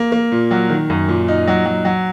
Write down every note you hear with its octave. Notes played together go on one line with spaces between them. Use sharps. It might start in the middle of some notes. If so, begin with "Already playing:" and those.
Already playing: A#3
A#3
A#2
F#3
D#3
F#2
A#2
D#4
F#3
F#3
F#3